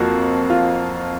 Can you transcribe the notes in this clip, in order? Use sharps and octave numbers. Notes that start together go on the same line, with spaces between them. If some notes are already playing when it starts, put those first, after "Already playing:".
Already playing: F2 F3 A#3 F#4
F4